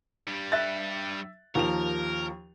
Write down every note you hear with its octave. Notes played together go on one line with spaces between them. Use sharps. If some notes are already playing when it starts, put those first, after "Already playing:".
G2 G3
E5 F#6 A6
D#2 F3 A#4 F7